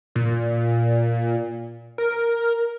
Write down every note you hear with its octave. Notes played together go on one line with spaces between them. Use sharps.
A#2
A#4